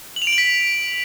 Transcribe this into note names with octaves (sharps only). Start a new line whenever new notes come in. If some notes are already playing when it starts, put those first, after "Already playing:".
F#7
F7
D7
F#7
B6